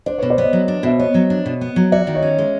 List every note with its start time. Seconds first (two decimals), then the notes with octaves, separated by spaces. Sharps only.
0.06 D4 C5 D5
0.18 B4 C#5
0.23 B2
0.30 C5 D5
0.38 B3 C#5 D#5
0.53 F#3
0.68 D4
0.83 B2 E5
0.99 B3 C#5 D#5
1.14 F#3
1.30 D4
1.46 B2
1.61 B3
1.76 F#3
1.92 F#4 D5 E5
2.07 D#3
2.15 C#5 D#5
2.22 C#4
2.38 G#3